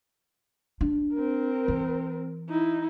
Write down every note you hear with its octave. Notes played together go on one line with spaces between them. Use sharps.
D4
C4 A#4
E3
D#4 E4